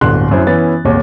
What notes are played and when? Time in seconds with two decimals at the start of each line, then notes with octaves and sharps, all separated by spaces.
0.01 D1 G1 C6 F#6
0.31 F#2 E4 C5
0.47 E3 B3 C#4 A6
0.85 D#1 G#1 D#2 C#5